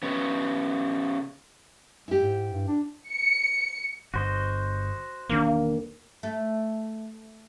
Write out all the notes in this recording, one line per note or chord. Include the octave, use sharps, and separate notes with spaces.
C#3 B3
G#3 E4 G4
G#2
G2
D4
C#7
G1 F#4 C5 D#5
E1 D#3 A#3 D4
A3